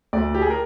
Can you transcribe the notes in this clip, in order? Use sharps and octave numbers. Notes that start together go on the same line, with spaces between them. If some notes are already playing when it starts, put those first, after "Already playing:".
D2 D5
G4
G#4
A#4